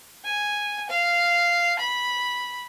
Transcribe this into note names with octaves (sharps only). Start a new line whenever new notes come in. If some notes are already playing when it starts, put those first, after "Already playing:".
G#5
F5
B5